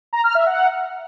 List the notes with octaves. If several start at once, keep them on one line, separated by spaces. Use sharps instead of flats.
A#5
F6
E5
F#5